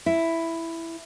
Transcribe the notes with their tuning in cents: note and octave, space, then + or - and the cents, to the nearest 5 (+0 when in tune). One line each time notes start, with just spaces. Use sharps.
E4 +5